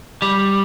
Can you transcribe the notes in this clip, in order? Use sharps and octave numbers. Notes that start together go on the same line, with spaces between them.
G3